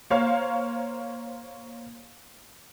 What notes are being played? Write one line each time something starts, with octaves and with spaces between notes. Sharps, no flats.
A#3 C5 C#5 F5